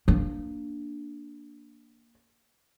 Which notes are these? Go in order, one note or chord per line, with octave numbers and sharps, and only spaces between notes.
A#3 D4